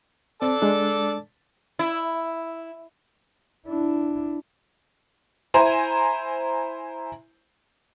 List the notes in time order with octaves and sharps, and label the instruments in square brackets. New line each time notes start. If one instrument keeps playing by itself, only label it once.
[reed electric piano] C4 [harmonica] A4 D5 A5
[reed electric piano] G#3 D4
[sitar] E4
[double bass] D4 E4
[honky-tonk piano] E4 C5 G#5 A#5